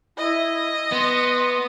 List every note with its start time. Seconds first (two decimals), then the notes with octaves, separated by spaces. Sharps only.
0.17 E4 D#5
0.92 B3 C6